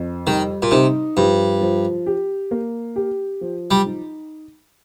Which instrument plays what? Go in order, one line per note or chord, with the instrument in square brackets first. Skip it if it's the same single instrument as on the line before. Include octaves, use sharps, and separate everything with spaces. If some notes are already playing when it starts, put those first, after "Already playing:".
Already playing: [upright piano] F2
[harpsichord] D#3 [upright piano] G3
[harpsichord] A#2
[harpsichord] C3 [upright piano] D#4
[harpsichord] G2 [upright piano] F3
[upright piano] F3
G4
A#3
G4
F3
[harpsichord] G3
[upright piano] D#4